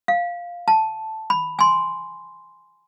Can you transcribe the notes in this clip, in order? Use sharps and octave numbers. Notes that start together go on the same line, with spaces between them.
F5
A5
B5
G#5 C6